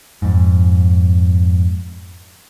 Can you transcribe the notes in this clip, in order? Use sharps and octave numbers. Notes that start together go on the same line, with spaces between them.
F2 G#2